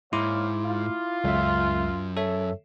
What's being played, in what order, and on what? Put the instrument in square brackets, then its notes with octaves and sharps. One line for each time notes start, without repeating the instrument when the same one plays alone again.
[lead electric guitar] G#2 [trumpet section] A#3 C#5 F5 [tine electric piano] E4 C6 D6
[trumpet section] F4
[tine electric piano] C#2 E5 [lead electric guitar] F#2
[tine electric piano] A4 C#5 E5